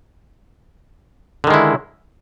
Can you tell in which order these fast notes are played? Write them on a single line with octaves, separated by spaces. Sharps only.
D3 D#3 G#3 E4